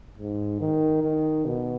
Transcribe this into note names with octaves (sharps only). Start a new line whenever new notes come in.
G#2
D#3
D#3
B2